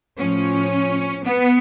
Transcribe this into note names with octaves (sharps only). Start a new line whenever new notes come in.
A2 F3 C#4
B3